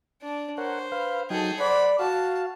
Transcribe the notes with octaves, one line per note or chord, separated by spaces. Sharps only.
D4 D5
A#4 C5 C#5 F#5
B4 F5
F#3 D#4 G#4 A4 G5
C5 D5 F#5 B5
F#4 F5 A5